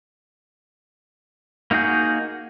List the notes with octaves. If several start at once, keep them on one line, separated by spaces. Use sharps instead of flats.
A#3 D#4 F#4 G#4 G6